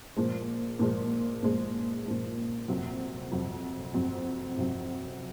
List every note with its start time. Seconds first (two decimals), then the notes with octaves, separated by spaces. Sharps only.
0.17 A#2 F3 G#3
0.79 A#2 F3 G#3
1.43 A#2 F3 G#3
2.06 A#2 F3 G#3
2.68 F2 C3 F#3 C4
3.32 F2 C3 F#3 C4
3.94 F2 C3 F#3 C4
4.57 F2 C3 F#3 C4